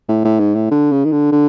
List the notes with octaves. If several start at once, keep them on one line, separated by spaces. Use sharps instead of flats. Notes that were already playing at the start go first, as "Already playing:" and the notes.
A2
A2
G#2
A2
D3
C#3
D#3
D3
D3